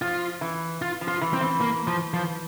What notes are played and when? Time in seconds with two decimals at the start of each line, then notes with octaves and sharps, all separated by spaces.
0.02 F3 F4
0.41 E3
0.82 F4
1.01 F3
1.08 F4
1.21 E3
1.34 C4
1.41 E3
1.61 A#3
1.87 F3
2.13 F3